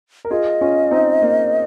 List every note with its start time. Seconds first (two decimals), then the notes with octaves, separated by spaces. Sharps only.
0.25 A#4
0.31 F4 G#4 D#5
0.61 C#4 F4
0.91 C4 D#4
1.22 A#3